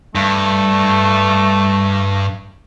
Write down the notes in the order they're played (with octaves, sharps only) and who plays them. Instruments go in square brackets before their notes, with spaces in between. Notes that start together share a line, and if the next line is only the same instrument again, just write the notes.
[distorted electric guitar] G2 [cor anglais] A3